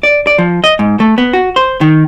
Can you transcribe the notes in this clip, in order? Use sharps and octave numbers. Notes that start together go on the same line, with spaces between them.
D5
D5
F3
D#5
G#2
A3
B3
F#4
C5
D#3